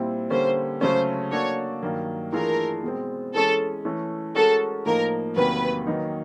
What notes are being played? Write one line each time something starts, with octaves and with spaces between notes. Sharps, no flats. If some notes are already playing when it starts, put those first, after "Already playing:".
Already playing: A#2 G3 C4 E4
D3 G3 A#3 C#4 C5
C#3 F#3 A3 C#4 C5
A#3 D4 F#4 A4 C#5 D5
G2 D#3 F#3 A#3
E3 A3 D4 F4 G#4 A#4
B2 G#3 C4
E3 G#3 C#4 A4
E3 A3 C#4
G#3 C#4 F#4 A4 A#4
A2 F3 A#3 D#4 A#4
E2 C3 D#3 F#3 A#3 B4
D#3 F#3 A#3 D#4